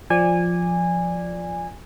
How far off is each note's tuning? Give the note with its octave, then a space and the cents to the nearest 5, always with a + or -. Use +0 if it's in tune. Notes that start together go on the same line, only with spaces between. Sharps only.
F3 +0 D5 +0 G#5 -20